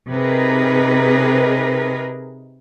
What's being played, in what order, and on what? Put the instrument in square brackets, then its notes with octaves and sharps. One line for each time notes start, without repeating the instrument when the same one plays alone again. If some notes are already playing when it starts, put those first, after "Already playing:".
[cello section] C3 D#4 G#4 A#4 B4